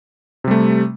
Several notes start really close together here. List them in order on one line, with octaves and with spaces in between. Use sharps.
C3 G3 A3